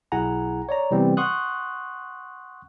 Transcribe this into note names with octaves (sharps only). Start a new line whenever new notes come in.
B1 E4 G#4 F#5 G#5 A#5
C#5 D5 A#5
C3 E3 G3 B3 C4
F#5 C6 C#6 D#6 F#6